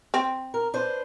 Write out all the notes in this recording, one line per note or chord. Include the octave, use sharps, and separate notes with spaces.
C4
A#4
D4 B4 C5